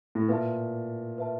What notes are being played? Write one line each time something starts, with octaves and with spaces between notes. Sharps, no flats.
A2
A#2 B4 E5 A5
B4 E5 A5